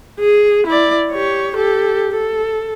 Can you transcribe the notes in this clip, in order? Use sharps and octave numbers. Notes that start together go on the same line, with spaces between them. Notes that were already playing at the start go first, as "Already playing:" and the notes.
G#4
E4 D5
G4 C#5
G4 A4
A4